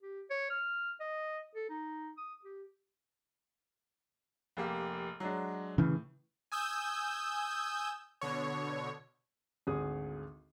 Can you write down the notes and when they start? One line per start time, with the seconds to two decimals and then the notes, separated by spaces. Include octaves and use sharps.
0.03 G4
0.30 C#5
0.50 F6
1.00 D#5
1.55 A4
1.69 D#4
2.17 D#6
2.44 G4
4.57 F1 A#3 G4
5.20 F#3 G#3 D4
5.78 A2 C#3 E3
6.52 G#5 D#6 E6 G6
8.21 B2 D3 C#5
9.67 G#1 D2 G#4 D#6